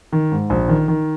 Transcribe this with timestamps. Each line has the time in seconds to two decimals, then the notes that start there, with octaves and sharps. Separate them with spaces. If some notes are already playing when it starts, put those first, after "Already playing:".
0.13 D#3
0.32 G#2
0.50 A#1
0.69 D#3
0.88 D#3